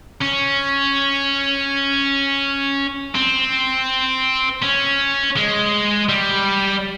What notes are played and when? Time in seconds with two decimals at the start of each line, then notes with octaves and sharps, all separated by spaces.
0.22 C#4
3.16 C4
4.63 C#4
5.36 G#3
6.09 G3